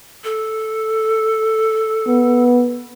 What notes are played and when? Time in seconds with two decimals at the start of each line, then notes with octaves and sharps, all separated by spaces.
0.24 A4
2.07 B3